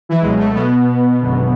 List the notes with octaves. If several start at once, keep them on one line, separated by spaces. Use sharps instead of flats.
E3 E4
C#2 B2 F#3 G#3
A3
B2 B3
G#1 F#2 D3